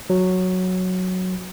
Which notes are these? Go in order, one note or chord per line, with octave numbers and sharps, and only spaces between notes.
F#3